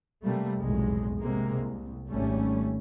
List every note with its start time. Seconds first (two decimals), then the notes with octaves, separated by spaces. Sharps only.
0.24 C3 G3 A3 A#3
0.60 F1 B1 E2 A2 G#3
1.22 C3 G#3 A#3
1.53 C2
2.10 G#1 G3 A3 C#4